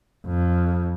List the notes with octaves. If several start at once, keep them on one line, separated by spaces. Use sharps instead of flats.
F2